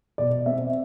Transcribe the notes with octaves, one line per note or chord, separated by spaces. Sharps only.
B2 D5
C4 E5